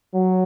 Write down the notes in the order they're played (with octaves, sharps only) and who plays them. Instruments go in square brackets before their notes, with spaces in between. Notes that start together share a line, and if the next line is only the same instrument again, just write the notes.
[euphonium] F#3